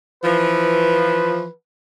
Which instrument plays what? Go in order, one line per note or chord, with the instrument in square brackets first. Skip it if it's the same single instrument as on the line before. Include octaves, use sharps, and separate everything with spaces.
[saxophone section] E3 F3 [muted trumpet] B4